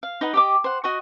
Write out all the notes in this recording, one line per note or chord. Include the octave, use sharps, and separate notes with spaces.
F5
D#4 B4 D#5 F#5
G4 D#5 D6
C5 F#5
F#4 D#5 C#6